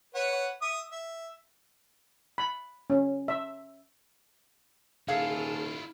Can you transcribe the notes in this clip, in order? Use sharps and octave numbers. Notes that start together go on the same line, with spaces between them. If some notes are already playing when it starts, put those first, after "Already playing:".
B4 C#5 F#5
E5 D#6
E5
B5
C#4
E5
D#1 E4 F4 G#4 A4 F5